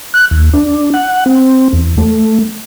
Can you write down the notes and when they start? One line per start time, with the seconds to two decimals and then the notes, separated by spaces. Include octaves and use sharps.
0.14 F#6
0.31 D#2
0.53 D4
0.94 F#5
1.26 C4
1.73 E2
1.98 A3